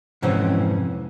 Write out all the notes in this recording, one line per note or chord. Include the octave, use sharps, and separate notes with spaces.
F2 G#2 C3 E3 C4 C#4